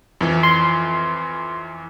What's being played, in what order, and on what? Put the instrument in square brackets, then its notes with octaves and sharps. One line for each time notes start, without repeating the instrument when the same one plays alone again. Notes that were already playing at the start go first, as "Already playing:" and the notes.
[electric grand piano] F2 E3
[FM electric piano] C6